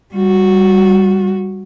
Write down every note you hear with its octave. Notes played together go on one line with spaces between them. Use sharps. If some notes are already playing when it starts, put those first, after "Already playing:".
G3 F#4